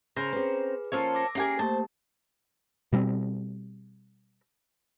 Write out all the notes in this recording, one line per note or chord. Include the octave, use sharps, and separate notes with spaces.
C#3 A#4 C5
C4 C#4 G#4 B4
F3 A#3 C#4 F4 A4 C#5
D6 A#6
A#3 C#4 F4 G4 G#4 A#4
A3 A#3 G4 C5 A5
B2 G3 A3 C4